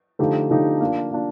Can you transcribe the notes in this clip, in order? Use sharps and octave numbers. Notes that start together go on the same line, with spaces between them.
D3 F3 A3 D#4 G4
D3 F3 A3 D#4 G4
A#3 D4 F4
A#3 D4 F4